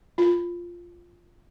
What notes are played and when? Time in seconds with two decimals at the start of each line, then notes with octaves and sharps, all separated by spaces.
0.18 F4